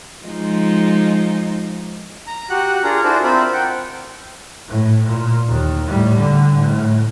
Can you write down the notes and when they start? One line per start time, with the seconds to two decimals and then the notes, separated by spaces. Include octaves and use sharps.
0.23 F3 G#3 D#4
2.27 A#5
2.50 F#4 G4 F#5 F#6
2.84 D4 F4 G#4 A#4 A#5
3.04 D4 E4 F#4 A4 C5 D5
3.24 C4 F4 A#4 C5 E5 B5
3.53 F#5 G5
4.68 A2
5.07 A#2
5.48 D#2
5.87 A2 G3
6.16 D3
6.56 A2